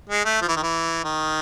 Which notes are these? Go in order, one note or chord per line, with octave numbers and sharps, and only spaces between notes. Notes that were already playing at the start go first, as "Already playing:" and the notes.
G#3
A3
F3
E3
D#3
E3
D#3